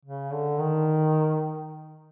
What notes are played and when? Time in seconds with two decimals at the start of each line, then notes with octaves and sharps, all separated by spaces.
0.05 C#3
0.33 D3
0.60 D#3